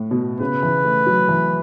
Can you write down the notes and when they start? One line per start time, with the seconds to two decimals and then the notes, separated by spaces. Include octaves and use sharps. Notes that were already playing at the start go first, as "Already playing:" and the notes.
Already playing: A2
0.11 B2
0.40 C#3 B4
0.63 E3
0.85 A3
1.06 F#3
1.29 E3